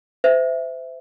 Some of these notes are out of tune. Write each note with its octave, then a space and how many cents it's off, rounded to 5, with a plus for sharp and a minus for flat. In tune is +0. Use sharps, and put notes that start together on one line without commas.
C5 -35 E5 +0